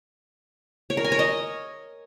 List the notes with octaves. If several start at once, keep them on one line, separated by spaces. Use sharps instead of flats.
C#5
A#4
G#5
C#5
D#5